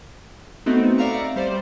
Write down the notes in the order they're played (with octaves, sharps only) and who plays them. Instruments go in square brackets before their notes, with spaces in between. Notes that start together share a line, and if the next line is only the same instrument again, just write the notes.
[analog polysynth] A3 B3 C4 D#4 F#4
D5 E5 F5 A#5 C#6
G3 C5 D5